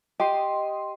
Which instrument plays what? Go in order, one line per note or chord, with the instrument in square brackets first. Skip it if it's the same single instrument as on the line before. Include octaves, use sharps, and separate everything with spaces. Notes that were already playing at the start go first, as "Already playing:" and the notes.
[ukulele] G4 [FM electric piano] D#5 C6